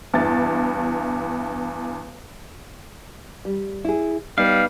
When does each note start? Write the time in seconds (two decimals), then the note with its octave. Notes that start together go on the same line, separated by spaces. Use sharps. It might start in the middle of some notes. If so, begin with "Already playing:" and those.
0.14 E2 G2 E4 A6
3.45 G3
3.85 E4 G#4
4.38 G3 B3 D#4 F5